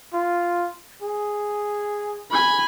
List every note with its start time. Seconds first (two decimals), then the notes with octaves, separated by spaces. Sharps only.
0.13 F4
1.02 G#4
2.31 G#5 B5